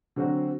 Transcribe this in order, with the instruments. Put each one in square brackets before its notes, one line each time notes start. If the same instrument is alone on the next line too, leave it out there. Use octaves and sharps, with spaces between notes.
[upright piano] D3 F#3 C4 F#4